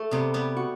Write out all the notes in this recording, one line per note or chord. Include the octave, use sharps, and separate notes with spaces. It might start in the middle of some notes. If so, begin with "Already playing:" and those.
Already playing: A3
C3 G3 B3
G3 B3
F#4